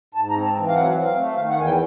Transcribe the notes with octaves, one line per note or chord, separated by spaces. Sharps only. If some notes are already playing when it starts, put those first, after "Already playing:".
G#2 A5
A#5
C4
A5
E3
F5
F#3 F#5
C4
F5
A3
D#3 F5
F#5
E2
G#5
G5